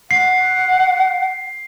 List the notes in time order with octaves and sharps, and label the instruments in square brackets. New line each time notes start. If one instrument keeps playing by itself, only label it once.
[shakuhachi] F#5 [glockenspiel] C7